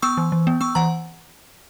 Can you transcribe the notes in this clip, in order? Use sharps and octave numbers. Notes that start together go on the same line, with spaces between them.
B3 C#6 E6
E3
E3
B3
B3 C#6 E6
E3 F#5 A#5